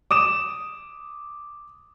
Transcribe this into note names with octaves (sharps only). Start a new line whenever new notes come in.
D6 D#6 E7